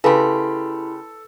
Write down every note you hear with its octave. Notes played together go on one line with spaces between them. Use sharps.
C#3 E4 G4 A4 B4 B5 C6